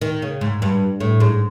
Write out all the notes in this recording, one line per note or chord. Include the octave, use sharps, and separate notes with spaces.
D#3
C#3
G#2
G2
A2
G#2